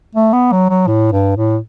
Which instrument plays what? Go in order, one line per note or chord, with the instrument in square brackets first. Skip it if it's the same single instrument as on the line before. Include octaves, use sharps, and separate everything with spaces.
[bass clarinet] A3
B3
F#3
F#3
A2
G2
A2